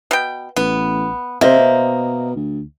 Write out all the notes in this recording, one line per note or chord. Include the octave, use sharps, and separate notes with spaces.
B2 G5
A1 B3
C3 A#3 C5 D#5 E5
B2
D2